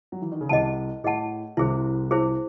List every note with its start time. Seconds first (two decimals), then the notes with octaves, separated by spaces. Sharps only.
0.12 F#3
0.21 E3
0.32 D#3
0.41 C#3
0.49 C2 C3 G#4 D#5 F#5 A5
1.04 A2 G#4 D#5 F#5 A5
1.57 C2 C3 E4 G#4 C5
2.11 E4 G#4 C5